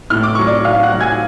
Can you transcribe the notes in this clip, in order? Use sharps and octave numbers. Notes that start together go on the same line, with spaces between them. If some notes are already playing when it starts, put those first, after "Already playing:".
A2 F6
D6
F#3 C#6
D5 D6
A2 F5 F6
F#5 F#6
F#3
G#5 G#6